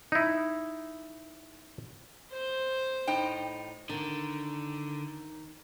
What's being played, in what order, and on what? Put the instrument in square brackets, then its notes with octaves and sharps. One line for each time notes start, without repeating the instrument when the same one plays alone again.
[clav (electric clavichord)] D#4 E4
[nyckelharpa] C5
[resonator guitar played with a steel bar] A2 D#4 G5
[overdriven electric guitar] D3 [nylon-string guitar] D#3